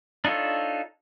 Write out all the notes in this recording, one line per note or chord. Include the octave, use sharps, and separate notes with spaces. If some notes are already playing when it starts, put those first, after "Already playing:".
D4 D#4 F4 A4 C#5